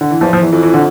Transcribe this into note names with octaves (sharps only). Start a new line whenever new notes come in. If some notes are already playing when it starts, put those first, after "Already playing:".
D3
E3
E2 F3
F3
E2 E3
F2 E3
E3
D3